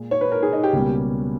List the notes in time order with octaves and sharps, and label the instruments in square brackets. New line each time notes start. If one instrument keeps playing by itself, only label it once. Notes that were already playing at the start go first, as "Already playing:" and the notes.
Already playing: [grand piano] A#2 G#3
[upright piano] C#5
B4
A#4
G#4
D#4
G4
[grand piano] C#2 B2 G3 A#3 C#4